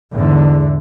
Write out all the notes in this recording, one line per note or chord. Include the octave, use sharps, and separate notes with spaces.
E2 G#2 D3